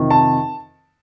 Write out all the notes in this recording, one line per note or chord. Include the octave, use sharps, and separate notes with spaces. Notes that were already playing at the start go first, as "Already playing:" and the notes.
Already playing: F2 C3 D#3
A5